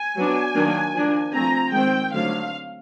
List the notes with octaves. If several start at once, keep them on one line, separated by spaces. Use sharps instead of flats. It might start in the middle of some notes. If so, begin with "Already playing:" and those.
Already playing: G#5
F#3 B3 D4
D#3 F#3 A#3 D4
F3 A#3 D4
F3 A3 C4 A#5
D#3 G#3 C4 G5
D3 F#3 A3 C4 F5